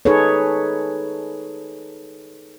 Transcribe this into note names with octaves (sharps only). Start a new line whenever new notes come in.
D#4 G#4 A4 B4 C#5